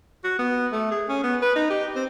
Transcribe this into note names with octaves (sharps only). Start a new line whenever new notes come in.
F#4
B3
A3
G#4
C#4
B3
B4
D#4
G4
C4